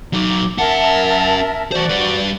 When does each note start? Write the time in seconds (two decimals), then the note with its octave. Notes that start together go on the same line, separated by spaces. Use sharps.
0.13 F#3 D#4 D6
0.58 C#4 A#4 E5 F#5 A5
1.72 E3 F#4 C5 D5
1.89 G3 B4